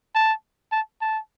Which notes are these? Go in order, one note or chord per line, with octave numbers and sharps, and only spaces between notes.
A5
A5
A5